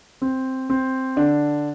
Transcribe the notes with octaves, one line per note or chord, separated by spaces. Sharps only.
C4
C4
D3 D4